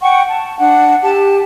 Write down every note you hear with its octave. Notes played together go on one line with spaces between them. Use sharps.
F#5 G5 C#6
A5
D4 F#5
G4 A5